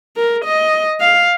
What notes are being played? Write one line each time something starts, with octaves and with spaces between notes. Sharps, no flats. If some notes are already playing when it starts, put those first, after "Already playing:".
A#4
D#5
F5